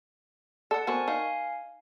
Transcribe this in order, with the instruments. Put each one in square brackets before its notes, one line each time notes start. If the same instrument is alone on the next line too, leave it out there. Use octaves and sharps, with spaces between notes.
[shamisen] A4 [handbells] D5 F#5 A5
[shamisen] B3 C4 F#4 [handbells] A#4 G#5 C#6
[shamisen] D#4 [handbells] F5 G#5